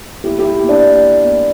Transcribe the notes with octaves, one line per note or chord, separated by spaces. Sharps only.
A#3 E4 G4
A#3 E4 G4
A#3 D4
A#3
A#3
A#3